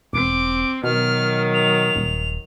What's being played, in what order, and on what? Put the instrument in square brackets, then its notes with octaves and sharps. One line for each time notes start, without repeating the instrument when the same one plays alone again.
[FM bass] E1 [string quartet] C4 [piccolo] D6
[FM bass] B2 [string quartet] D#3 F#3 [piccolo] F6
[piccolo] F7
[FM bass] D#1